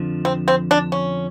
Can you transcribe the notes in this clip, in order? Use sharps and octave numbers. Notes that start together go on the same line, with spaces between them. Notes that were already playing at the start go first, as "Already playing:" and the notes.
Already playing: F2 D3 F3
C4
C4
D4
C#4